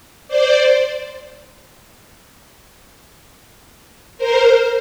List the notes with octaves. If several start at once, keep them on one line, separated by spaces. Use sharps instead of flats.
C5 D5
A#4 C5